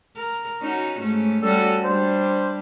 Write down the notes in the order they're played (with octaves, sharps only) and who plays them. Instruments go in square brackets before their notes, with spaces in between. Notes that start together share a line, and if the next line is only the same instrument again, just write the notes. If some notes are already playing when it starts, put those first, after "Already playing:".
[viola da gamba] A#4
C#4 D#4 F#4
G#2 A3 C#4
[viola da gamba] G3 C#4 F#4 [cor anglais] A4
[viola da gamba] G3 D4 [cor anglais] C5